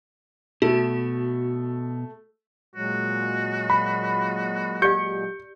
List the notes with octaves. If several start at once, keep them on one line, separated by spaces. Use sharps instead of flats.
B2 A3 F#4
A#2 F#3 G#3 F#4
B5
G4 D5 F5 G6 C#7